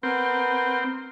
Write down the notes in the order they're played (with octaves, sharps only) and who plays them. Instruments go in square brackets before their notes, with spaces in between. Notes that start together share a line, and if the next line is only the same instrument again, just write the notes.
[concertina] B3 A#4 B4 [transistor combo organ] C4